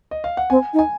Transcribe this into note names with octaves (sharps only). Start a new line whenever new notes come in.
D#5
F5
F#5
C4 G#5
D#4
G#5